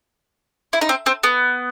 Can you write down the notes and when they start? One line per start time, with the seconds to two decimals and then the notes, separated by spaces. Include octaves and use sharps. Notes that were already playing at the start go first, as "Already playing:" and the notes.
0.73 E4
0.81 D#4
0.89 C4
1.06 C4
1.23 B3